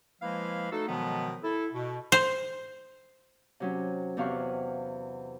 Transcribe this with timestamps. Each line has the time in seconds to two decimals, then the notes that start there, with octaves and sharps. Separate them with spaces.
0.22 F3 G#3 A#3 E4 B4 F5
0.71 A3 D#4 F#4 A4
0.88 B2 D#3 F3 F#3 G#3 B3
1.44 E4 A4
1.74 B2
2.12 C5
3.60 C3 F#3 C#4
4.17 E2 C3 F5 C#6 F#6